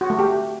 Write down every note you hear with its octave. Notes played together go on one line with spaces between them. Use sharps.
F#4
A3
G4